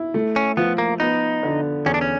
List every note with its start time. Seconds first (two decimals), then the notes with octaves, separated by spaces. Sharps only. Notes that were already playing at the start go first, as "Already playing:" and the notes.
Already playing: E4
0.14 A3
0.36 C#4
0.57 F3 B3
0.78 A#3
1.00 B3 D#4
1.43 D3
1.86 E2 C#4
1.94 D4
2.01 C#4